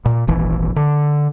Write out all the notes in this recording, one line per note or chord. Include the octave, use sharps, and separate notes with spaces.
A#2
D#1 G#1 E3
D3